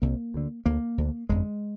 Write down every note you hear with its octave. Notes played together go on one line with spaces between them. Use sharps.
C2 C3 A#3
D2 D3
D2 D3 A#3
D2 D3
G1 F2 D3 G#3